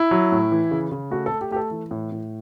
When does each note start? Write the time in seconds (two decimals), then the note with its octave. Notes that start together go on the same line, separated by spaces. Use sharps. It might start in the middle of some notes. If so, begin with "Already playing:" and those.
Already playing: E4
0.11 F#3
0.32 A2
0.52 E3
0.71 C#3
0.91 C#3
1.11 A3 F#4
1.26 A4
1.32 A3
1.41 G4
1.51 A3 G4
1.56 A4
1.71 E3
1.91 A2
2.12 A2